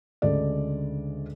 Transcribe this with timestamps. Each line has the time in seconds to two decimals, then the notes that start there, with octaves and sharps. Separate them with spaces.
0.22 D2 C#3 G#3 A4 D5